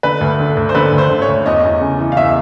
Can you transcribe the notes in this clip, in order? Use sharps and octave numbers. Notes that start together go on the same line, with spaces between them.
D3 B4
D2
D3
D2
C5
D3 B4
D2
C5
D3
C#5
D2
E2 D#5
E2
C#3
E3
F5
E2 E5